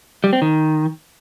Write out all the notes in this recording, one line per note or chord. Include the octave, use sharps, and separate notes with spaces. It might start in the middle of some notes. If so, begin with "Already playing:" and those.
G3
C4
D#3